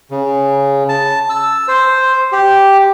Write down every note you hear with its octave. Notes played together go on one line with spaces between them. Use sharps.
C#3
A5
E6
C5
G4